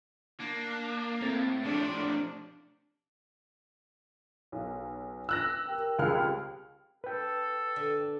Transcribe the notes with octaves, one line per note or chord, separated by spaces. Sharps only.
A#3 D4
A2 A3 C4 A6
C3 F3 D4
B1 C#3 B4
D6 E6 F#6 A#6
G4 A#4 G5
C#2 G3 C4 D#4 G#4 F6
A4 B4 G5
D3